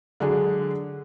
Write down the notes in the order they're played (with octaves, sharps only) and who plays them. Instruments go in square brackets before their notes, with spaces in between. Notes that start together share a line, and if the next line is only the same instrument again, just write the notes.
[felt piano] D3 F#3 G#3 D4 G#4